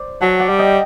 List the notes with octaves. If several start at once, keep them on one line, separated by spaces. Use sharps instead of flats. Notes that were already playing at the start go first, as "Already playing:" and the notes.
Already playing: C5 D5
F#3 F#5 A5
D5 F#5
G3
D#5 G5